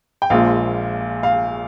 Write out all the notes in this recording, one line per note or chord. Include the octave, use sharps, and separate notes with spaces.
G5
A#1 A#2 F3 G#3 F5
F5